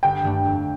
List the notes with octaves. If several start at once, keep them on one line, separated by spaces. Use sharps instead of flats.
G1 G5
G2 D#3 A3 D4
F2